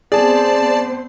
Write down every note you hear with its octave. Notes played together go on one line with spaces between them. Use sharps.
B3 C4 G#4 C5 D5 A5